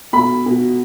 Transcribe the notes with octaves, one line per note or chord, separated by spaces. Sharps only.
B2 B5
B2